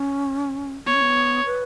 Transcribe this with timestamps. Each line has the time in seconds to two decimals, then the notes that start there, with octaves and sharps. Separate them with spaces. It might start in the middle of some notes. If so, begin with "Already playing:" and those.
Already playing: C#4
0.86 B3 C#5
0.94 C#4
1.02 B3
1.46 B4